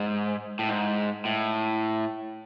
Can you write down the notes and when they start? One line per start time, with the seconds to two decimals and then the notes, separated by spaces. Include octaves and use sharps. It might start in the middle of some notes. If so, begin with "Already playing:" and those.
Already playing: G#2
0.59 A2
0.69 G#2
1.25 A2